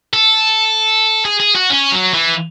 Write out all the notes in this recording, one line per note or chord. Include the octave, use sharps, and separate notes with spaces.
A4
G#4
G#4
F#4
C#4
F#3
E3